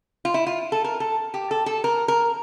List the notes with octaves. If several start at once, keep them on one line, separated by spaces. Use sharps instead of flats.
F4
E4
F4
A4
A#4
A4
G4
A4
A4
A#4
A#4